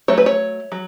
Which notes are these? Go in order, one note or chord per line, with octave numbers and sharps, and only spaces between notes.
F#3 A3 C#5
B4
C#5
F#3